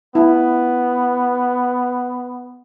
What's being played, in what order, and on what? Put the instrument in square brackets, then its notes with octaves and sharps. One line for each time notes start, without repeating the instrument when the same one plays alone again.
[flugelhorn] B3 [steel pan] E4